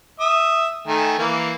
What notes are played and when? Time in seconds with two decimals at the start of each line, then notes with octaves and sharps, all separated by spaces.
0.20 E5 D#6
0.87 D#3 A3 G#5
1.19 E3 A#3